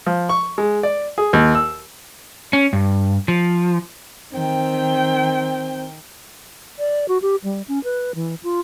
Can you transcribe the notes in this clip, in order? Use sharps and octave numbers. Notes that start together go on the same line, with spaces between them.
F3
C#6
G#3
D5
G#4
D#2
E6
C#4
G2
F3
D#3 C4 G5
D5
F#4
G4
G3
C#4
B4
E3
F4